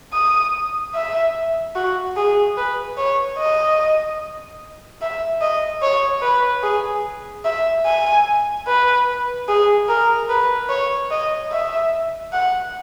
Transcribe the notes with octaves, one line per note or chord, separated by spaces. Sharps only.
D#6
E5
F#4
G#4
B4
C#5
D#5
E5
D#5
C#5
B4
G#4
E5
G#5
B4
G#4
A#4
B4
C#5
D#5
E5
F#5